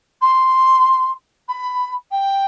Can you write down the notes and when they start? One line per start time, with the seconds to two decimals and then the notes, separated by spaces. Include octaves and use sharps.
0.21 C6
1.48 B5
2.11 G5